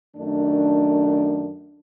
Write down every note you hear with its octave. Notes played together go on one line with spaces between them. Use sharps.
F#2 D#3 A3 D4